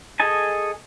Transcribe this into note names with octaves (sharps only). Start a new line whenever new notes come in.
G#4 A4 D#5 G#5 A5